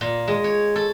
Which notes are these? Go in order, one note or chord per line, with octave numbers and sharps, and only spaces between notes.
A#2
G#3
C#5
A4